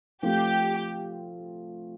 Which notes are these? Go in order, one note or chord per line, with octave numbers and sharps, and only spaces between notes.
F3 A3 C4 F4 G4